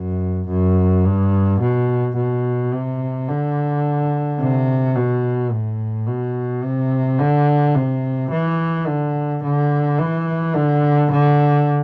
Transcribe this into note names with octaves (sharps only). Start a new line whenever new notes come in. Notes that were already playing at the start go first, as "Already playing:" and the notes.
Already playing: F#2
F#2
G2
B2
B2
C3
D3
C3
B2
A2
B2
C3
D3
C3
E3
D3
D3
E3
D3
D3